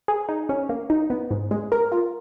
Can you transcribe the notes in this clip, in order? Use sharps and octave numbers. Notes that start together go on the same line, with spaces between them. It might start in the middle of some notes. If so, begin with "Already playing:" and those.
G#4
D#4
C#4
A#3
D#4
B3
G#2
G#3
A#4
F4